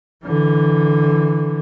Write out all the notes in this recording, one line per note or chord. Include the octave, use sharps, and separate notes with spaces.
D3 E3